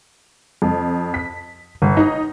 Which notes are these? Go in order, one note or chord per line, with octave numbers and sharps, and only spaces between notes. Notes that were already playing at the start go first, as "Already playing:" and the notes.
F2
B6
G1
D#4